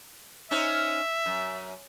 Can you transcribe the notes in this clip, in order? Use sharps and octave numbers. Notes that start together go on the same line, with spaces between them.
C#4 D#4 C5 E5
F#2